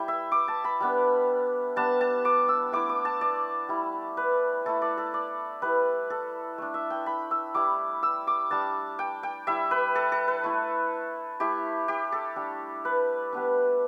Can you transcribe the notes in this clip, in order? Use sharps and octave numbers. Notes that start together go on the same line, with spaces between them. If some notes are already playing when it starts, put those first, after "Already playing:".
Already playing: G3 E4 G5
E5
D6
A5
B5
G3 B3 D4
G3 B3 D4 A5
A5
D6
E6
A3 E4 D6
D6
A5
D5
G3 E4
B4
A3 E4 A4
D5
A4
D5
G3 E4 B4
A4
A3 D4
E5
G5
B5
E6
G3 E4 D6
E6
D6
G3 D4 A5
G5
G5
G3 E4 E5
B4
A4
A4
B4
A3 E4
A3 E4 G4
G4
A4
G3 D4
B4
G3 B3 D4